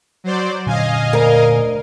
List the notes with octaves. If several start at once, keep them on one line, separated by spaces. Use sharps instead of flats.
F#3 C5 D5
A#2 D3 C#4 D#5 F5 G#5
D2 A#4